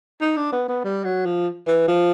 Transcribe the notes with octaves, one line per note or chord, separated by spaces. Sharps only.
D#4
D4
B3
B3
G3
F#3
F3
E3
F3